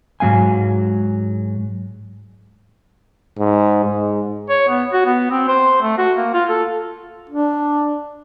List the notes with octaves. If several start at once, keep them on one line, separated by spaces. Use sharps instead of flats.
G#2 F#3 B3 F5 G#5
G#2
G#2
C#5
B3
F#4
B3
C4
C5
A3
F#4
A#3
F4
A4
D4